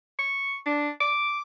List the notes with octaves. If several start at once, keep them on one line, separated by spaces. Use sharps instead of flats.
C#6
D4
D6